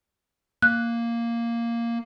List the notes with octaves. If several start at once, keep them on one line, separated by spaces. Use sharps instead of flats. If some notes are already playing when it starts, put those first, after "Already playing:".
A#3 F#6